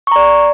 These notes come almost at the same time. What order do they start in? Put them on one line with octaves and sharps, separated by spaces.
C#6 A#5 D5